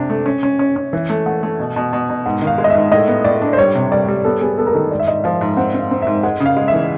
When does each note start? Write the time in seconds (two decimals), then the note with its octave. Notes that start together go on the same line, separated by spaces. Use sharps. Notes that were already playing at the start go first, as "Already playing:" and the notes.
Already playing: C3 D4
0.10 A3
0.26 C#4
0.43 C#4
0.59 C#4
0.76 C#4
0.93 E3 E5
1.10 A3
1.26 A3 F#5
1.43 A3
1.60 B2
1.76 B2
1.93 B2
2.09 B2
2.26 G#2 F#5
2.42 D#3
2.47 F5
2.58 G#3
2.64 D#5
2.70 G#2 E5
2.92 A2 D#5
3.08 B3
3.24 A2 D5
3.42 D4
3.53 C5
3.58 G3 C#5
3.75 C3
3.92 G3 D5
4.08 G3
4.24 B3 A4
4.41 B3 G#4
4.58 B3 A4
4.67 A#4
4.75 D#3 A4
4.91 G#2 D5
4.99 E5
5.07 G#2 D#5
5.24 F3 F5
5.41 G#2
5.57 C4 F#5
5.74 C4
5.80 F5
5.91 C4
6.02 G#2 E5
6.23 G#3 F#5
6.40 C#3
6.46 F5
6.57 G#3
6.68 E5
6.73 E3